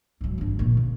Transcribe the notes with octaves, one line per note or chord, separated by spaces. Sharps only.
G#2 F#3
G1 F2
A#2 A#3
C#3